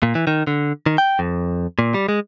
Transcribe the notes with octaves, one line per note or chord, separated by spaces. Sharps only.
A#2
E3
D#3
D3
D#3
G5
F2
A#2
G3
G#3